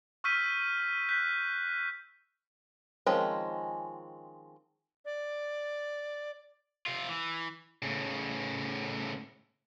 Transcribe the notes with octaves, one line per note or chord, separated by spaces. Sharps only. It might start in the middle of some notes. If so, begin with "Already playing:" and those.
C#6 E6 F6 G6 B6 D#7
F#6 G6 B6
D#3 F3 G#3 C4 C#4
D5
C3 F4
E3
A2 C#3